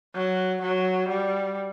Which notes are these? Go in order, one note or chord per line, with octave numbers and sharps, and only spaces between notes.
F#3
F#3
G3